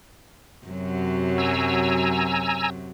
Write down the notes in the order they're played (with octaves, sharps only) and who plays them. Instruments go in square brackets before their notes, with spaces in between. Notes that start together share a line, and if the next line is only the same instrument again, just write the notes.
[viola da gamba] F#2 C3 F#3
[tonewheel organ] G#5 A#5 E6